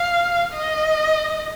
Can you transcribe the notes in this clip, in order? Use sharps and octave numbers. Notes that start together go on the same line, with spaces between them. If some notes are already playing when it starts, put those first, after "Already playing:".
Already playing: F5
D#5